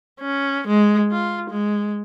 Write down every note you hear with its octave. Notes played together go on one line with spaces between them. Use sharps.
C#4
G#3
F4
G#3